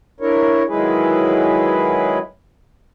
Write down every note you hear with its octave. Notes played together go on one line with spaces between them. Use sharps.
D4 E4 A#4 C#5
D#3 F#3 G#3 E4 G#4 B4